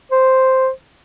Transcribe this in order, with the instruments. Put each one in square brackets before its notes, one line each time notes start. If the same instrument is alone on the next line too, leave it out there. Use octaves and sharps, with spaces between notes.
[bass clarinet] C5